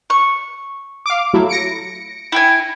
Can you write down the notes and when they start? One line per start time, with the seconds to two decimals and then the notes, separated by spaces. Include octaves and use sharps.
0.10 C#6
1.06 F5 D6
1.33 F#3 A3 E4
1.49 A#6 C#7 D7
2.32 E4 G5 G#5